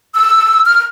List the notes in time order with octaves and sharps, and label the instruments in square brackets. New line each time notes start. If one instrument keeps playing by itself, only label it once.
[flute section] E6
F6